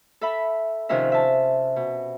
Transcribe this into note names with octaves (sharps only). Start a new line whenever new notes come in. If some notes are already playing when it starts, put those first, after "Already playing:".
A4 E5 B5
C3 D#3 F3 C#4 A#4 E5
E5 A5
B2